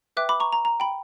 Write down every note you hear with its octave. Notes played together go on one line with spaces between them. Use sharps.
B4 E5 G5 D6 F#6
B5 D6
A#5 C#6
A#5
A#5
G5 B5